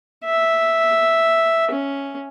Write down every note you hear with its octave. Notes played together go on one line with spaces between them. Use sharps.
E5
C#4